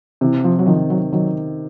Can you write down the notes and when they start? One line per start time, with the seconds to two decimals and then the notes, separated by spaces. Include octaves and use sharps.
0.21 C3 E3
0.44 F3
0.59 F#3
0.66 D#3 F3
0.90 F#3
1.12 D#3 F#3